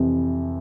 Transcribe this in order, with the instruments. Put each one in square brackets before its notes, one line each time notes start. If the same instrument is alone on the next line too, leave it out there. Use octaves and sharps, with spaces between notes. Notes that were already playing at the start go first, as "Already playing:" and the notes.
Already playing: [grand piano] F2 C3 E3